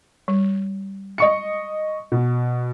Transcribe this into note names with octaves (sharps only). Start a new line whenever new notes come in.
G3
D#5 C#6 C#7
B2